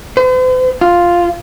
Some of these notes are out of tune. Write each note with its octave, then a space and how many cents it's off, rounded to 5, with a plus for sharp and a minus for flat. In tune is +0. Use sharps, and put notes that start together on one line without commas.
C5 -45
F4 +0